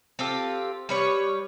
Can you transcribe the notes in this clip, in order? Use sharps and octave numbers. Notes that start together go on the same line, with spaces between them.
C4 F4 G4 A4
G3 B4 C#5